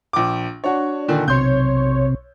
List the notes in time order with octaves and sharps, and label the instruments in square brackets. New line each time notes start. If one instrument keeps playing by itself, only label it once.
[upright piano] A#1 D6
[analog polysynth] D4 [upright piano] F#4 C#5
[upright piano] A#2 D3 D#3
[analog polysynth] B1 C#5 [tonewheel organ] C3 [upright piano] C6 G6